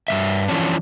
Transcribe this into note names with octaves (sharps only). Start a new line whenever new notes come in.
G2 F3 E5
E3 F3 C#4 D4